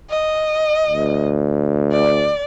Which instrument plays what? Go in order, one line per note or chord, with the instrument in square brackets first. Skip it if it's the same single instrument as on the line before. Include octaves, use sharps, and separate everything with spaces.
[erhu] D#5
[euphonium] D2
[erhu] D5